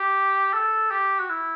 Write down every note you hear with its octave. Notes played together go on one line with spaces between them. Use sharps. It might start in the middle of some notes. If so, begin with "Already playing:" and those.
Already playing: G4
A4
G4
F#4
E4